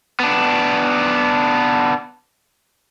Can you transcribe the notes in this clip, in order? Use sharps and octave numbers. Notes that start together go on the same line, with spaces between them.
B3 D4